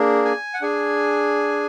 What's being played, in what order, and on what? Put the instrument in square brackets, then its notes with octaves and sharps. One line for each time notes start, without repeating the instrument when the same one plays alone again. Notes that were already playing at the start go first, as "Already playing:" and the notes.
Already playing: [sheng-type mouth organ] A#3 D4 G#4
G#5
F#5
D4 G#4 G#5